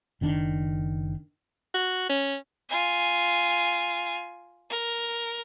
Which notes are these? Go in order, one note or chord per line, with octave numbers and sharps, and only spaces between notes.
F#1 D#3 D4
F#4
C#4
F4 G#5
A#4